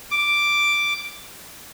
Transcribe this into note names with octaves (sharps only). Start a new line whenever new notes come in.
D6